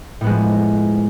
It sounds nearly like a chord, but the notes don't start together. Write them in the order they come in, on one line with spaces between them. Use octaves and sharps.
A2 B3 G#3 F3